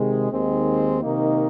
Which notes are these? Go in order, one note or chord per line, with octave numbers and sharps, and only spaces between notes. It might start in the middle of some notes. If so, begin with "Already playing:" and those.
Already playing: C3 D#3 G#3
D#2 D#3 G#3 C4
C3 D#3 A#3 D#4